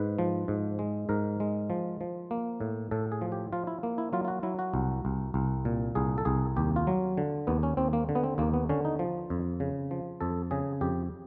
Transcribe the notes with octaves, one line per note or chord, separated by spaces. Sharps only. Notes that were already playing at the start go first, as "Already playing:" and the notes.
Already playing: G#2 B4
F3
G#2
G#3
G#2 A#4
G#3
F3
F3
A#3
A2
A2 A4
G#4
F3
G4
F3 F4
E4
A#3
E4
F#3 F4
F4
F#4
F#3 E4
F#4
C2
C2
C2
A#2
C2 G#4
A4
C2 G#4
D#2 G4
F4
F#3
D3
D#2 B3
C#4
D#2 C4
A#3
D3
B3
C4
D#2 A#3
B3
D3 C#4
D#4
F3
F2
C#3
F3
F2 A4
C#3 G#4
F2 G4